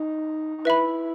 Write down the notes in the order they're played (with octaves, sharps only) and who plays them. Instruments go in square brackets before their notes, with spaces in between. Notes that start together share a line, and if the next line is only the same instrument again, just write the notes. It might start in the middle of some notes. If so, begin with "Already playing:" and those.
Already playing: [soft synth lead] D#4
D#4
[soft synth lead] E4 [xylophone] B4 E5 B5